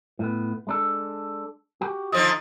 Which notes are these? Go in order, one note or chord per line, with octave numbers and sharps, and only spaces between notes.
A2 B3
G#3 D4 A4
F#4 G4
D3 F3 D#4 D#5